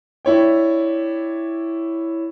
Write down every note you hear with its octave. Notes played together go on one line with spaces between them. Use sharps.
D4 E4 C#5 G5